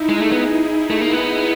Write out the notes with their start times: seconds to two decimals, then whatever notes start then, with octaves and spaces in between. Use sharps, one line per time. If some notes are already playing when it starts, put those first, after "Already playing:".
Already playing: D#4 E4
0.09 G#3 G#4
0.21 A3
0.32 B3
0.90 A3
1.00 A#3
1.12 B3